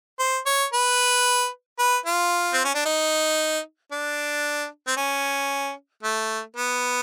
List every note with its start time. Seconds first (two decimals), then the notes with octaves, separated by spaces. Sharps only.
0.19 C5
0.46 C#5
0.73 B4
1.79 B4
2.06 F4
2.54 C4
2.65 C#4
2.74 D4
2.85 D#4
3.92 D4
4.87 C4
4.97 C#4
6.03 A3
6.56 B3